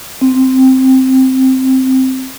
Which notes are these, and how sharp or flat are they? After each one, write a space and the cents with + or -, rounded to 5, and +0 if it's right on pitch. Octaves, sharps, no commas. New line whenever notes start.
C4 +0